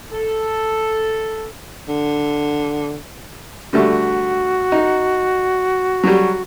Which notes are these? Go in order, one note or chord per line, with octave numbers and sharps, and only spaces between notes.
A4
D3
D3 G3 A3 F#4
D#4
F#3 G3